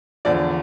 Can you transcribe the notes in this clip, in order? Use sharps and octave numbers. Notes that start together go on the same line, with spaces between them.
E2 D3 F3 D5